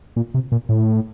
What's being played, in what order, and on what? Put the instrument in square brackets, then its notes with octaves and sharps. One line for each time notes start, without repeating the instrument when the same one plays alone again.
[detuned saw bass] A#2
C3
A#2
A2